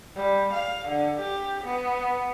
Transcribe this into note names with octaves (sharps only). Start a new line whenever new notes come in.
G3
F5
D3
G4
B3